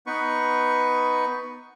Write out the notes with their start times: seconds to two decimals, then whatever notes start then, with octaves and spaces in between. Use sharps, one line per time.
0.07 B3 D#4 B4 C#6